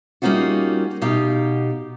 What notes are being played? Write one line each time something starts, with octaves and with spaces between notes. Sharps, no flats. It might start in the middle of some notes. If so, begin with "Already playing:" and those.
G3 A#3 C#4 D#4 F4 F#4
B2 D#4 G4 F5